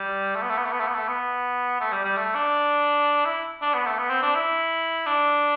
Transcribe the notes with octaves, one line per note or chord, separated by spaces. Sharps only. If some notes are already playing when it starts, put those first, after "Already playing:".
Already playing: G3
A3
B3
A3
B3
A3
B3
A3
B3
A3
B3
A3
G3
G3
A3
D4
E4
D4
B3
A3
B3
C4
D4
E4
D4